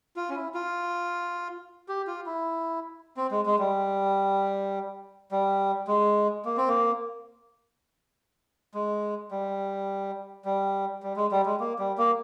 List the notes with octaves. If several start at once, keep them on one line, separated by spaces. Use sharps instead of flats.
F4
C#4
E4
F4
G4
F4
E4
C4
G#3
G#3
G3
G3
G#3
A#3
C4
A#3
G#3
G3
G3
G3
G#3
G3
G#3
A#3
G3
A#3